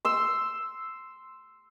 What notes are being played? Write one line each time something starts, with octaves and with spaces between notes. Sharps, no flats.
C6 E6